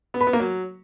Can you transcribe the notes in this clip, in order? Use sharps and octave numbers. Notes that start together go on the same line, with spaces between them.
B3
B4
B3
A#3
F#3